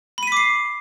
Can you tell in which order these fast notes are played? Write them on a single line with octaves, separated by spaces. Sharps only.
B5 D#7 B6 D6 C7